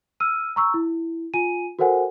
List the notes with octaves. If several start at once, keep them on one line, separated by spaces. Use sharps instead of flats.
E6 F6 D#7
A#5 C#6 E6
E4
F4 G#5 D#7
F#4 A4 A#4 C5 F#5 G#5